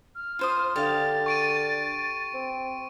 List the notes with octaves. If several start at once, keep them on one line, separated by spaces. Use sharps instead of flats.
F6
F4 C5 D#6
D3 G4 F5 A6
C#6 D7 D#7
C4